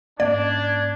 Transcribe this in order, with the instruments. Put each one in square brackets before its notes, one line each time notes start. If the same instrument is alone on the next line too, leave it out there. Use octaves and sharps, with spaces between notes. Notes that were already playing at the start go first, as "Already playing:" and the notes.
[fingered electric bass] G#2 A#3 C#4 [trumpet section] D4 [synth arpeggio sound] D5 [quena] G#6